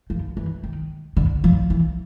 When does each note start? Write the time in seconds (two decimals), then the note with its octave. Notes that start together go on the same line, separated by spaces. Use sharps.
0.10 F3
0.37 E3
0.64 D#3
1.17 D3
1.44 F3
1.70 E3